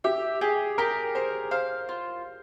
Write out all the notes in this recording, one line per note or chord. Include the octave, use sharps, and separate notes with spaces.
G4 E5
G4 G#4
G4 A#4
A#4 C5
C5 F5
F4